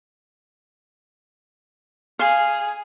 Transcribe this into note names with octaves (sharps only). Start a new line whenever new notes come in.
G#4 F5